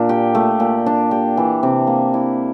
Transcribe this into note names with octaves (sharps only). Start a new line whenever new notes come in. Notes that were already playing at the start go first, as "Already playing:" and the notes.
Already playing: A#2 D4
G4
A3
A#2
D4
G4
E3
C3
A#3
E4